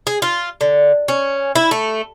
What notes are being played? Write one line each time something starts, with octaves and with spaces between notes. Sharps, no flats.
G#4
F4
D3
C#4
E4
A3